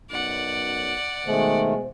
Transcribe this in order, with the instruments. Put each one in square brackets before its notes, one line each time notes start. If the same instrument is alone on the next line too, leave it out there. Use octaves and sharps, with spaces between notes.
[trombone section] B1 F#2 [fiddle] D5 F#5
[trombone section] B2 G#3 [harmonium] D#3 A3 [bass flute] C5